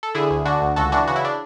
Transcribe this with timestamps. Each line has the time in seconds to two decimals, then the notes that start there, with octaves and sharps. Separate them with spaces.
0.03 A4
0.15 D3 E4 G#4
0.31 D2
0.45 D3 D4 F#4
0.61 D2
0.76 C#2 F#4 A4
0.92 E3 D4 F#4
1.07 C#3 F#4
1.16 E4
1.25 D4